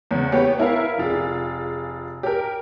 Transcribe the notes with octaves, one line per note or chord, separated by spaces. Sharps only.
E2 C#3
A#3 B3 G4 C#5
B3 E4 A#4 F5
F1 F4 G#4
G4 A#4